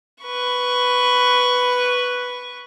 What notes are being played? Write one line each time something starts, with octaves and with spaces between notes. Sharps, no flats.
B4 C#6